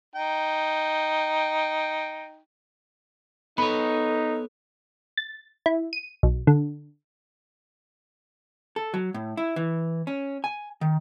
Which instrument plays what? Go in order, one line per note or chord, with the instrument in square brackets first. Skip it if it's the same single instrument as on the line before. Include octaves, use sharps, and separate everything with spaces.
[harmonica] D#4 G5
[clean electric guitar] B3 B4 C#5 [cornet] D#4 [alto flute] A4 [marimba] B5
[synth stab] A6
E4
D#7
B1
D3
[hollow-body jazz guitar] A4
F#3
A2
E4
E3
C#4
G#5
D#3